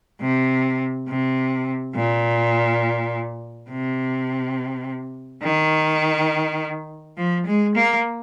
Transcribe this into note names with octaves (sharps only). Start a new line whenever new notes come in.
C3
C3
A#2
C3
D#3
F3
G#3
A#3